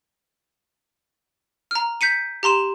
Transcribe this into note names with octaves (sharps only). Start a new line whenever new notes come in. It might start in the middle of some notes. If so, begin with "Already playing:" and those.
A#5 F6
G6 B6 C#7 D#7
G4 A#5 C6 E7